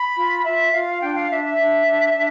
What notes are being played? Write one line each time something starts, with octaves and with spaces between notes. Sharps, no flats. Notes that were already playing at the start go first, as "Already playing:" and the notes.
Already playing: B5
F4
F4 E5
F4 F5
D4 G5
F5
D4 E5
E5
D4
D4
D4